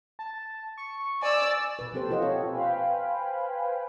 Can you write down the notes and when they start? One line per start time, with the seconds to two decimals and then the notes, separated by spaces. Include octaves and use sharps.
0.19 A5
0.78 C#6
1.22 D5 G#5 E6
1.79 B2 B4
1.93 F3 A#3 C4 G4 A4 C5
2.11 F4 A4 C5 D#5 F#5
2.22 C#5
2.53 B4 C5 F5 G5 G#5 B5